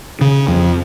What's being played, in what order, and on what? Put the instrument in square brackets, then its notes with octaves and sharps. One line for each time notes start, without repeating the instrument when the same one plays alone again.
[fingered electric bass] C#3
F2